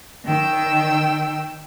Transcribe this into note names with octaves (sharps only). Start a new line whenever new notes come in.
D#3 G5 E6